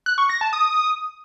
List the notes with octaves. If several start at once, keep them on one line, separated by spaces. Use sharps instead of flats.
F#6
C#6
A#6
A5
D#6